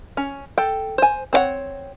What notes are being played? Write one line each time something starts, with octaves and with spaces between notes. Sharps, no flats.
C#4
A4 G5
C5 G#5
C4 C5 C#5 F#5